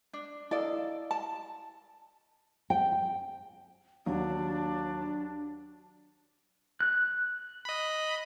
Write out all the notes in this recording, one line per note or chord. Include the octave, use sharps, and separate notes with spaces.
D4
E4 A4 D5 D#5 F5
A5
G5
D#2 F#3 D4
F#6
D#5 B5